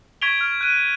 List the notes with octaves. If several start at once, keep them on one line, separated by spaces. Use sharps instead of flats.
C#6 G#6 B6 D7 F7 G7
F6
F#6 D#7